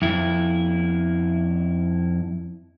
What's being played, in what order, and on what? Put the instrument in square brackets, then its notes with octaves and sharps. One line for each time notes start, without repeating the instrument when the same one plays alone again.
[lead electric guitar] F2 E4